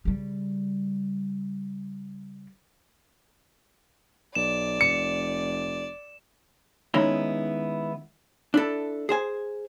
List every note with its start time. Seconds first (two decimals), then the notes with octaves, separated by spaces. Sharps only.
0.05 C#3 G3
4.35 B1 D5 E7
4.81 F1 C#7
6.94 D#3 G#3 B3 C#4 D#4 E4
8.54 D4 E4 A4
9.09 G#4 C5 G#5